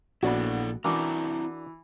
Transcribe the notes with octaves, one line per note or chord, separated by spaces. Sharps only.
A#1 B3 D4 E4 F#4 A4 D5
E3 C4 D4 E4 F#4 A#4 A#5 D6